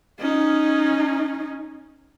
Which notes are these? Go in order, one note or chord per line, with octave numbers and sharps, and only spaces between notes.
C#4 D#4